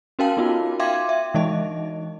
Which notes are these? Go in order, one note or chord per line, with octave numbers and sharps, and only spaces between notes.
C#4 F#4 A#4 F5 G5 A5
B3 D#4 F4 F#4
E5 F5 G5 C6 D6 G#6
E5
E3 G#3 D#4 D#5